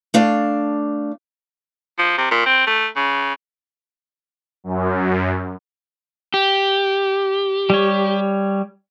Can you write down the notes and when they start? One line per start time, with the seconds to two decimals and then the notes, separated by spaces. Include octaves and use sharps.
0.14 A3 D4 F5
1.98 F3
2.18 C3
2.31 A#2
2.46 C4
2.67 A3
2.96 C#3
4.64 F#2
6.34 G4
7.70 G3 C#5